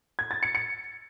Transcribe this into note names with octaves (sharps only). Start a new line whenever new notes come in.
G#6
A6
C#7
C#7